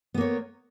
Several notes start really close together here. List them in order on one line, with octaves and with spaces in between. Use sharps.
B3 A#3 C#5